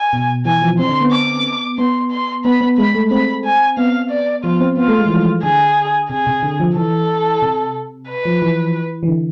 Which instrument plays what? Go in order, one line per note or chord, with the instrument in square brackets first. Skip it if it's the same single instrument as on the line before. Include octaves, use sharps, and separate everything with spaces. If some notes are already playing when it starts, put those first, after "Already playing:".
Already playing: [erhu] G#5
[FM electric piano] B2
[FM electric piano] E3 [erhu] G#5
[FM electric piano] F3
[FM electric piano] C4 [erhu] C6
[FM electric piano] D3
B3
[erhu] D6
[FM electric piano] B3 [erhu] C6
[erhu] C6
[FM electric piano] B3 [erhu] B5
[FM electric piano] B3
[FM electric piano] G#3 [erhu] B5
[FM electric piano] A3
[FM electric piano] C4 [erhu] B5
[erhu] G#5
[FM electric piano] B3 [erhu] F5
[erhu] D5
[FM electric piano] F3 [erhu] F4
[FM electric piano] C4
[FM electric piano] B3 [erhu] F4
[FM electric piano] A3
G#3
E3
F3
[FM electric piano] D3 [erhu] G#4
[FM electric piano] C3 [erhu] G#4
[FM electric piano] C3
D3
F3
[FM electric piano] E3 [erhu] A4
[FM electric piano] C3
[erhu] B4
[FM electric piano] F3
E3
E3
D3